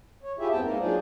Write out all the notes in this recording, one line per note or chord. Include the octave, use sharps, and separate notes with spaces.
C#5
E4 F4 G4 G#4 E5
E2 G2 B3 C4 G5 A5
G#3 A#3 D#4 A#4
F#3 D4 F4 G#4 C5 D5